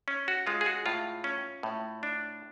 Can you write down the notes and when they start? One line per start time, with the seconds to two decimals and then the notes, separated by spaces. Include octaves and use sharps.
0.08 C#4
0.28 F#4
0.47 G#3 F4
0.61 G#4
0.66 F#4
0.86 A2 F4
1.24 C#4
1.63 A2
2.03 D4